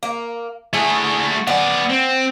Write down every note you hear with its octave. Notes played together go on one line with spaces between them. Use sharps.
A#3
A3 E4 F#4 G#4
B3 D5 F#5
C4